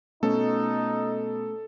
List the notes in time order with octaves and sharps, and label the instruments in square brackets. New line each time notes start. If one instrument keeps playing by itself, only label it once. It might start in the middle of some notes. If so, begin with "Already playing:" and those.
[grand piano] B2 [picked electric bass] A3 C#4 [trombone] D#4 [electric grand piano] A4